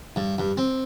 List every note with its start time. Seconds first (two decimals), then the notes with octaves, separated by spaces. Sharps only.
0.16 G2
0.38 G2
0.57 C4